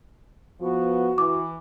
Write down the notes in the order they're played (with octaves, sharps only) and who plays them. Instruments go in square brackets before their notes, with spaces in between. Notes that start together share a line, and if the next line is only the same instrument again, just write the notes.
[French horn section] F3 B3 [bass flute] F#4
[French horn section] E3 [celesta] D6